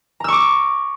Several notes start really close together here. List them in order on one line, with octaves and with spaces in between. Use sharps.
A#5 E6 C#6 D6